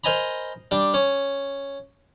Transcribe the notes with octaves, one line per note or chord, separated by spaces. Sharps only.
A#4 C5 D#5 G#5 A#5 B5
G3 D4
C#4